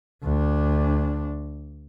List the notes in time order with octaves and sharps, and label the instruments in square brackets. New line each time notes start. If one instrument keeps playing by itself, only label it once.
[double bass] D2 D4